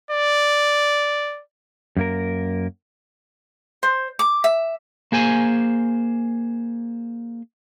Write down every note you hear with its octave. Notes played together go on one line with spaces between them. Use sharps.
D5
F#2 A#3 A#4
C5
D6
E5
A#3 G#4 C5 G#5